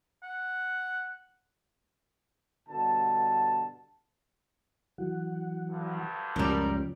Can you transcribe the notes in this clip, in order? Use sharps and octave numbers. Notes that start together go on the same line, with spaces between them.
F#5
G2 B2 D3 A5
E3 F#3 F#5
D2 G2
C#2 F#2 F3 G3 C#4 A#4